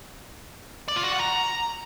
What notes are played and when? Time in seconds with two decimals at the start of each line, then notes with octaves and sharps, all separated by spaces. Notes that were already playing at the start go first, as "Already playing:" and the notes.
0.88 D5
0.96 F4
1.04 F#4
1.12 F#5
1.20 A#5